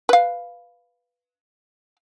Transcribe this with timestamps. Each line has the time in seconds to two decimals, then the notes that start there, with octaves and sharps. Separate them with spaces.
0.09 B4 F5